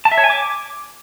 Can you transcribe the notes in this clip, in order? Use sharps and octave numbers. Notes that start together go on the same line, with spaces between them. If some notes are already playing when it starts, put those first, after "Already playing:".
A5
E5
C#5
G#5
D6